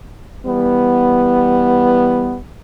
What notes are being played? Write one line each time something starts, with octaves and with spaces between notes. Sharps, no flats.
E3 G3 B3